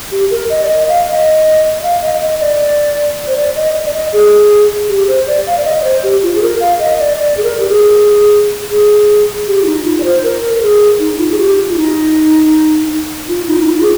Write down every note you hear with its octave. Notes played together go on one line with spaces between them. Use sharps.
G4
A#4
D#5
D5
D#5
F5
D#5
D#5
F5
D#5
D#5
D5
C5
D5
D#5
D5
D#5
G#4
G4
C5
D5
F5
D5
D#5
D5
C5
G4
F4
G#4
A#4
F5
D#5
D5
D5
G#4
A#4
G4
G#4
G#4
G4
F4
D#4
F4
D5
C5
A#4
A#4
G#4
D#4
F4
G#4
G4
F4
D#4
F4
D#4
D#4
F4
G#4